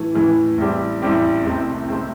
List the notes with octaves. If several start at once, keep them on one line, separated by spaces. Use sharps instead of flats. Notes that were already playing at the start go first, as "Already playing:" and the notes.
Already playing: A2 E3 A3
A2 E3 A3
A1 A2 G3 C4 G4
A1 A2 G3 C4 G4
C2 C3 A3 C4
C3 A3 C4